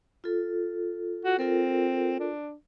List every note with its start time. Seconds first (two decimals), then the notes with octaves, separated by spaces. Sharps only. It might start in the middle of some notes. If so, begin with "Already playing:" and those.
0.24 F4 A4
1.25 F#4
1.39 C4 F4 A4 A#4
2.20 D4